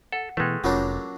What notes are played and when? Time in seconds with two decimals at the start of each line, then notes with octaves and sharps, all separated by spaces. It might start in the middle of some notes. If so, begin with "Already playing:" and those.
0.12 A4 F#5
0.37 B2 E3 G#3 A3 B4 G5
0.64 F1 F#3 A#3 C#4 D4 F4 C#5